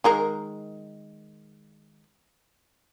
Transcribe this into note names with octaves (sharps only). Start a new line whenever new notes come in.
D#3 G#3 A#4